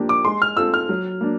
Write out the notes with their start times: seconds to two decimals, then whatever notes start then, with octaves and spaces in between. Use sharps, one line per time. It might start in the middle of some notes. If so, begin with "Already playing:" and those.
Already playing: F3 A#3 D4 G4
0.09 D6
0.25 G#3 C6
0.42 F6
0.57 C4 F4 A4 C5 E6
0.74 F6
0.89 F#3
1.21 A#3 D4